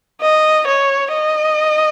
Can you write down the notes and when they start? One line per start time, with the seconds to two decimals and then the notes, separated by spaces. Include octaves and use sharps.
0.22 D#5
0.68 C#5
1.13 D#5